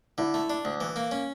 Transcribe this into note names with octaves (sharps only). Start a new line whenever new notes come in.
D3 E4
A3
D4
D2
E3
A#3
C#4